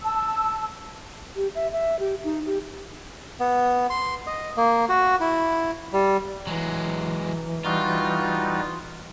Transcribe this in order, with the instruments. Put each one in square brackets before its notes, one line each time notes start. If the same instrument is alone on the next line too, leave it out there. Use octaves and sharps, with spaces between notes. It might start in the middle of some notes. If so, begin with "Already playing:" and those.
[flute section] A5 E6
[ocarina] G4
E5
E5
G4
D#4
G4
[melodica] B3
C6
D#5
A#3
F#4
E4
G3
[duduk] E3 [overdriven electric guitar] F#3 G#3
[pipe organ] G3 D#4 F#4 [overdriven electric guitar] F4